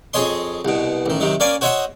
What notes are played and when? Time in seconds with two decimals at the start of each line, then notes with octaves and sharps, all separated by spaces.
0.13 F2 G#4 C#5 D#5 C6
0.65 C2 B2
1.06 A1 D#3
1.20 C3 D#3 F#3
1.40 A#3 C#4 D5 F5 G#5
1.61 F#4 C5 C#5 D#5 E5 F#5